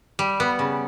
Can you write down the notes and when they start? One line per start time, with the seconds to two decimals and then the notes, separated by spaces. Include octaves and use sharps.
0.19 G3
0.40 B3
0.59 C#3